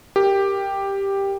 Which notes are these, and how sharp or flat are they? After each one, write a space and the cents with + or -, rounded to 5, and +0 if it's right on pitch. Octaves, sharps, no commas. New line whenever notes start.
G4 +5 A#4 +0